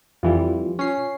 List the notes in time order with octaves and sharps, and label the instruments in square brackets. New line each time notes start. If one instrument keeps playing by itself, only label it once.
[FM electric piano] F2 E3 G3 [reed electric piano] F4
[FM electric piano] C#4 C7